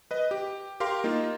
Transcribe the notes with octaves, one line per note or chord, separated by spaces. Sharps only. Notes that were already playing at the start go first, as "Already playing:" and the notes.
B4 D#5
G4
G4 A#4 F5 C6
A#3 D#4 F4